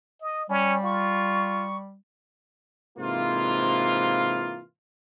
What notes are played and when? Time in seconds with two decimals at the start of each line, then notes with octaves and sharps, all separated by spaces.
0.21 D#5
0.50 G3 C#4
0.84 F4 C#6
2.98 G#2 C3 E3 A#3 F4